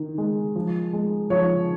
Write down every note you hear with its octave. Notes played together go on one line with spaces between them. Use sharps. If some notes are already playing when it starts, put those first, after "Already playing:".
Already playing: D#3
G#3
F3
G#3
F3 C#5